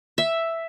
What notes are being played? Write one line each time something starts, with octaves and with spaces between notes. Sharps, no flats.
E5